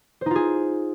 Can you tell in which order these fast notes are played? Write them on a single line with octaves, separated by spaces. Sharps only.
C5 D#4 F4 G#4